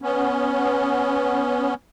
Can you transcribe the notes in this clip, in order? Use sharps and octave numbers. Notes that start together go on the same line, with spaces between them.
B3 C#4